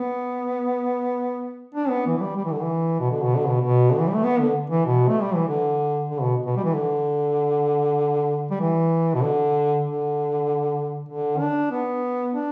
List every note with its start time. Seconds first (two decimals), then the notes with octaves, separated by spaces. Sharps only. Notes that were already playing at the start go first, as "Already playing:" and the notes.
Already playing: B3
1.74 D4
1.89 B3
2.06 E3
2.17 E3
2.21 G3
2.36 G3
2.45 E3
2.53 D3
2.61 E3
2.99 B2
3.11 D3
3.22 B2
3.36 D3
3.48 B2
3.61 B2
3.92 D3
4.00 E3
4.08 G3
4.15 A3
4.23 B3
4.39 D3
4.70 E3
4.86 B2
5.08 A3
5.22 G3
5.35 E3
5.48 D3
6.10 D3
6.22 B2
6.46 B2
6.57 G3
6.64 E3
6.73 D3
8.51 G3
8.60 E3
9.14 B2
9.22 D3
9.85 D3
11.08 D3
11.40 D4
11.71 B3
12.33 D4